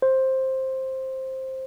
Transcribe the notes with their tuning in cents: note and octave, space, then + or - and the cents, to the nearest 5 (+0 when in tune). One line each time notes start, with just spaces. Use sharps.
C5 +10